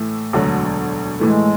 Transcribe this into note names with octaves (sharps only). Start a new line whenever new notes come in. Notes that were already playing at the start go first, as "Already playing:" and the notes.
Already playing: A2 E3 A3
E1 D2 D3 F#3
A2 E3 G#3 A3